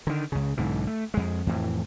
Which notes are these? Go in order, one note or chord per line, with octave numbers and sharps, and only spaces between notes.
D3 D#3
C#2 C#3
B1 G#2 D3 E3
A3
F2 G#3
F2 A2 E3